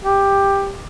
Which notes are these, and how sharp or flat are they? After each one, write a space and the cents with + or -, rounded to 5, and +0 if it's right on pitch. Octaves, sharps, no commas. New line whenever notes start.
G4 +10